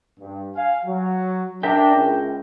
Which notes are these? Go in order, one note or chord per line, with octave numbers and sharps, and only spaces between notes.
G2
F5 G#5
F#3
D4 A#4 E5 G5
C#2